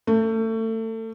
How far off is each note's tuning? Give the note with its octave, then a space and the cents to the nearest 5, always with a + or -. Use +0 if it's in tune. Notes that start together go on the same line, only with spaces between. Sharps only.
A3 +30